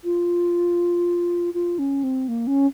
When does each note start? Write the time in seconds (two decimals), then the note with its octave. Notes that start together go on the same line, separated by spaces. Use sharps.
0.04 F4
1.54 F4
1.79 C#4
2.04 C4
2.28 A#3
2.47 C#4